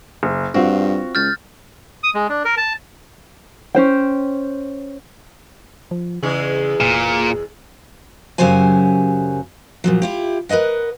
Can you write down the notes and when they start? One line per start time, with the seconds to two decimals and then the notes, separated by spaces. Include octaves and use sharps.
0.23 F#1
0.54 G2 C4 F4 F#4
1.15 C#2 F6 G6 A6
2.03 D#6
2.15 G#3
2.29 D4
2.45 A#4
2.57 A5
3.75 C#4 C5 G5
5.91 F3
6.23 E2 C#3 G#3 G#4
6.81 F1 A#2
8.38 F#2 C#3 F#3 G4 C5 G#5
9.84 A#2 F3 F#3
10.02 E4 F4 G4
10.49 A#4 B4 D5 D#5 F#5